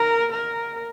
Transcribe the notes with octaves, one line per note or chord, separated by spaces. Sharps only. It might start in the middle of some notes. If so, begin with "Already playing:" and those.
Already playing: A#4 A#5
A#4